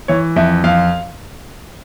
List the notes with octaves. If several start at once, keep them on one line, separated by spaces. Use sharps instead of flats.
E3 C#5
F2 E5
F2 F5